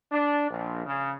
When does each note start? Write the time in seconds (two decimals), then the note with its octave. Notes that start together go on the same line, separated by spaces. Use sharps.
0.12 D4
0.50 A#1
0.86 C#3